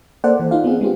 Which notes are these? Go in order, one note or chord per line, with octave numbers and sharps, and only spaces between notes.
A#3 A4 C5 D5 F#5
E3
D#4 F4 F5
B3 C4 G#4
G#3 D4 F4 G4